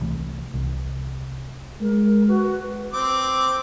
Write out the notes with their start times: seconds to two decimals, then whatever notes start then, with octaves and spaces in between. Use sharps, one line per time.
0.01 C2 E3 A3
0.54 C2
1.81 G#3 A#4
2.28 F#4 B4
2.93 C4 D6